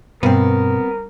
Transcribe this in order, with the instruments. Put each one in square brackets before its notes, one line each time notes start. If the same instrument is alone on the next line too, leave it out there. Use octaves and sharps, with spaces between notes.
[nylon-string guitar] G2 [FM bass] B2 [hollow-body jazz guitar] B3 C4 [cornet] A#4